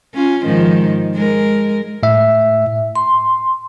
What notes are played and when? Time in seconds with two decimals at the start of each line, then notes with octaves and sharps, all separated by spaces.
0.14 C#4 F4
0.44 G#2 D#3 F3
1.14 G#3 A#4
2.03 A2 E5
2.96 C6